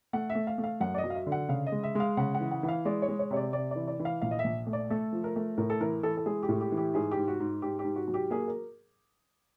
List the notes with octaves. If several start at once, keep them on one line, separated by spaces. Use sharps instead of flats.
A3 F#5
E5
A3
F5
A3
F5
F#2 F#5
D5
D#5
F#3
F5
E5
D3
F#5
C#3 F5
D#5
G#3
E5
G#3 F5
C#3 F#5
F#5
E3
F#5
E3 F#5
F5
G#3 D5
C#5
G#3
C#5
C3 C#5
D5
C3 D5
E3 D5
D5
E3
F5
A#1 F5
D#5
E5
A#1
A3
D5
A3 A4
F3
A#4
A3
A2 A#4
A4
E3 A#4
E3 A4
A4
G#3 G#4
G4
A2
G4
E3
G4
G#2 G#4
G4
G#2
F#4
G#2
G#2 G4
G4
G#2
F#4
F#3
G4
A#3 G#4
A#4